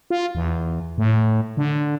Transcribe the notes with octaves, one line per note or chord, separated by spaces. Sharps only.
F4
E2
A2
D3